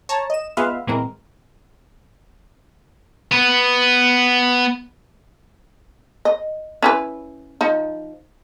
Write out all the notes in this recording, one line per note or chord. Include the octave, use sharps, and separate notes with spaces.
C#5 A5 A#5
D#5 E7
G#3 B3 F4 B4 E5 F5
A#2 E3 G#3 C4 A#4
B3 B4
D#5
C#4 E4 B4
F3 D#4